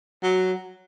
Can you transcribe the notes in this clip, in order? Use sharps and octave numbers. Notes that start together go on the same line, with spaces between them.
F#3